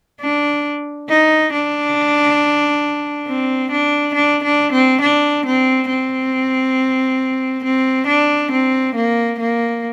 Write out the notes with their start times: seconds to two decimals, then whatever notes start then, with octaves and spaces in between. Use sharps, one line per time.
0.21 D4
1.09 D#4
1.52 D4
3.27 C4
3.71 D4
4.14 D4
4.43 D4
4.72 C4
5.01 D4
5.45 C4
5.89 C4
7.64 C4
8.07 D4
8.51 C4
8.95 A#3
9.39 A#3